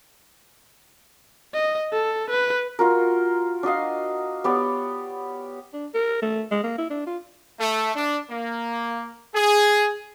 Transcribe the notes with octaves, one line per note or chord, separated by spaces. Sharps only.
D#5
A4
B4
F4 F#4 A#4
D4 F#4 D#5 F5
B3 G4 C#5 D5
D4
A#4
A3
G#3
A#3
E4
D4
F4
A3
D4
A#3
G#4